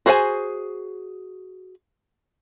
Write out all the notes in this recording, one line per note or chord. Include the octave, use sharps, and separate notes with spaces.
F#4 G#4 C5 F#5 G#5